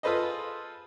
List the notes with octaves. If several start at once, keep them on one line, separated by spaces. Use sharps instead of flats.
F4 G#4 A4 B4 C5 D#5